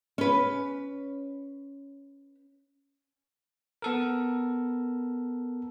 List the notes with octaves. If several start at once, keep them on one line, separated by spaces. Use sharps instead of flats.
C#4 B4
B3 A4 A#4